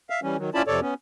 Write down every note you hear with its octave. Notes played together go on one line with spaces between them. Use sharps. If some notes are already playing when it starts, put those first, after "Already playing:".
E5 F5
E3 G3 C#4
D#3 F#3
C#4 E4 F4 D5 A5 B5
F2 C3 A4 C#5 D5
B3 C#4